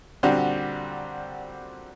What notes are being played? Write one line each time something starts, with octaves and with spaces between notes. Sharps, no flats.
A#2 D3 G3 C4 F#4 G4